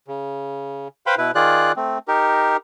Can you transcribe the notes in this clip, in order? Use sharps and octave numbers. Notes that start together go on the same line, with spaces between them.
C#3
B4 C5 F5 G5 B5 C6
B2 E4 B4
D#3 F4 G#4 D5 F#6
A3 C4
D#4 G4 A#4